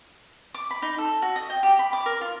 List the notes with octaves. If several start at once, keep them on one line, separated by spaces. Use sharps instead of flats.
D6
B5
D#4
A4
F#4
D#5
G5
G4
B5
D6
A#4
F4